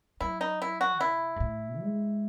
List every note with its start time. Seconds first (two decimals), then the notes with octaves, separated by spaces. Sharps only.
0.21 F#3 E4
0.41 D#4
0.62 E4
0.81 F#4
1.01 C3 E4
1.36 G#2
1.40 A2
1.81 G#3